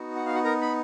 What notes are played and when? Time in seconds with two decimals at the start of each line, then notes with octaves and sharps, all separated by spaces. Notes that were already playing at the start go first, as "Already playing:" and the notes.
Already playing: B3 D#4 F#4
0.16 F#5
0.26 F5
0.34 F#4 F#5
0.44 A#4 A#5
0.61 B5